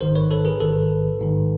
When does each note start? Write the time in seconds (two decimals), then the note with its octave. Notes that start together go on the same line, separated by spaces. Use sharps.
0.01 A1 G#2 D#3 A#4 C5
0.15 B4 C#5
0.31 A4 B4
0.45 G#4 A#4
0.60 A1 G#2 D#3 A4 B4
1.20 A1 G#2 D#3